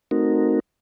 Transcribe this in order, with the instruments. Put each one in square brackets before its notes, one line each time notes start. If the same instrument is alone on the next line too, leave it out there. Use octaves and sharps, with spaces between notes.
[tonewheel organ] A3 C4 D#4 F#4 A#4